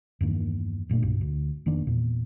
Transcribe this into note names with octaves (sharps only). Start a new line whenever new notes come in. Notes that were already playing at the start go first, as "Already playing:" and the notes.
E2 G2 D#3 A#3
F#1 A#2 A3 D4
C2 G2 B2
D2
F1 D#3 A#3 D4
E2 A#2